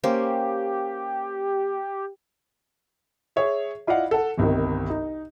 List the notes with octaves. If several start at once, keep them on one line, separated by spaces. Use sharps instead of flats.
A#3 C#4 G4 C5
G#4 C#5 E5
E4 F4 D5 D#5 F5 F#5
A4 F#5
G1 C2 C3 D#3
D#4